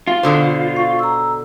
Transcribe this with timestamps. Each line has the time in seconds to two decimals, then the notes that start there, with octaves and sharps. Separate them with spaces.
0.07 F4
0.23 B2 D3 C5
0.76 F5 C#6
0.99 A#5 E6